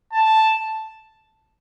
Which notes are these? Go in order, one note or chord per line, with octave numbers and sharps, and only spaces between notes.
A5